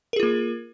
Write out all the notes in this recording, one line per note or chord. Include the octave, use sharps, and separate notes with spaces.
A#3 F4 G#4 A#4